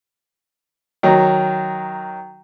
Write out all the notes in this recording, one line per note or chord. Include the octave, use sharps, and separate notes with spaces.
D#3 F#3